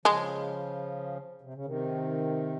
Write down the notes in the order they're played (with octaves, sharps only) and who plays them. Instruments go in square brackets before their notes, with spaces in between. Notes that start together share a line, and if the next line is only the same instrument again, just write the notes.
[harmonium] C#3 F3 [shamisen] G#3
[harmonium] C3
C#3
C3 D#3